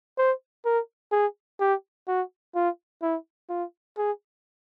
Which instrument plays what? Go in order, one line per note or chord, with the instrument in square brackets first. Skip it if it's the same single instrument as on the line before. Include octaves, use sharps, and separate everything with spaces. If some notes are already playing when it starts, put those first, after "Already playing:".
[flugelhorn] C5
A#4
G#4
G4
F#4
F4
E4
F4
G#4